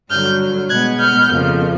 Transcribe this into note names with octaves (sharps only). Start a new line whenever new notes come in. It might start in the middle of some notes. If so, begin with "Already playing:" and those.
G2 D3 F#3 F6 G6
B2 G#3 B3 F#6 G#6
F6 G6
F2 C#3 F3 A#3